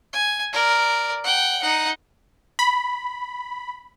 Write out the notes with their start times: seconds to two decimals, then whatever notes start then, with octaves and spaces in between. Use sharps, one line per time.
0.13 G#5
0.53 A#4 D5
1.24 F#5 G5
1.61 D#4 F#5
2.59 B5